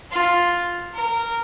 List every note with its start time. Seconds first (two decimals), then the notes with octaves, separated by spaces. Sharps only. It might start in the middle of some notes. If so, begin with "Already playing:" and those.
0.11 F4
0.95 A#4